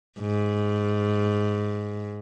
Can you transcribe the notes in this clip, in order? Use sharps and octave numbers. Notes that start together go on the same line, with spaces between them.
G#2